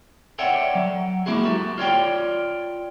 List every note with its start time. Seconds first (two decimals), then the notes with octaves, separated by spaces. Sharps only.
0.39 A4 C#5 D5 E5 F#5 G5
0.75 F#3
1.26 G#3 A#3 E4 F#4 G#4
1.43 F#4 G4 A4
1.78 F4 C#5 D5 G5